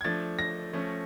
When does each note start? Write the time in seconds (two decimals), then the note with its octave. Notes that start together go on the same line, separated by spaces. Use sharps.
0.01 G#6
0.04 F3 A3 D4 A6
0.39 A#6
0.73 F3 A3 C#4